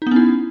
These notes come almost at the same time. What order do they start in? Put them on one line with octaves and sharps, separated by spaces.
D#4 B3 C#4 E4